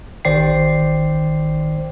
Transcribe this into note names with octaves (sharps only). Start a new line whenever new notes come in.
A1 D#3 C5 D5 G5 C7